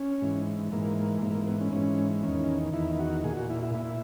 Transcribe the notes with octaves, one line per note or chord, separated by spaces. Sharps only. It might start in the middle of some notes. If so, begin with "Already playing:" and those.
Already playing: C#4
G#2 E3
G#2 E3 A#3
G#2 E3 A#3
A#3
B3
C#4
G#2 E3 C#4
E2 D#3 C#4
E2 D#3 E4
F#4
A#2 G#4
F#4
E4
E4
A#2 E4